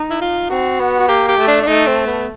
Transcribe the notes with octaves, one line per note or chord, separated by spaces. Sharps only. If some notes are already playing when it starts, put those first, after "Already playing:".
Already playing: D#4
E4
F4
C4 F#4
B3
F#4
A#3 G4
G4
A3
D4
D4
A3 D#4
C4
B3